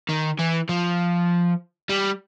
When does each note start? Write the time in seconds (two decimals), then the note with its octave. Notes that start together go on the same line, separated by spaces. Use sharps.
0.09 D#3
0.39 E3
0.69 F3
1.89 G3